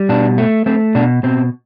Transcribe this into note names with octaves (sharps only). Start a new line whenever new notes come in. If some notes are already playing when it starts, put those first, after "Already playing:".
Already playing: G3
B2 D4
A3
A3 C4
B2 D4
B2 C4